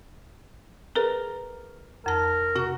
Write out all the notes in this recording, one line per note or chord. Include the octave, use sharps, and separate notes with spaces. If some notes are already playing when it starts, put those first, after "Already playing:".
G#4 A#4 B4
F2 A#4 A5
C3 F#4